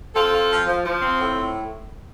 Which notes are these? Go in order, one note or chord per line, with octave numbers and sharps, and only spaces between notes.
C4 F4 A4
F4
F3
F3
F3
C4
A2